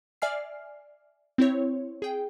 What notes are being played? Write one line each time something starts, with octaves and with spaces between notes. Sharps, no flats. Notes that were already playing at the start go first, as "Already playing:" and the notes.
D5 E5 G#5 F6 C7
C4 E4 C#5
G#4 G5